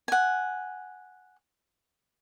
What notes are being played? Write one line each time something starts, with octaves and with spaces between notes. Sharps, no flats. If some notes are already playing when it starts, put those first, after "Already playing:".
F#5 G#5